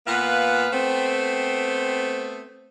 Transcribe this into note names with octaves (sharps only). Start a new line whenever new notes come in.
A#2 B3 B4 F5 F#5
A3 B3 C4